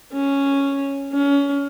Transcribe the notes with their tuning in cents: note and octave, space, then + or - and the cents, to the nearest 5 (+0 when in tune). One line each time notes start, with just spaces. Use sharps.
C#4 +0
C#4 +25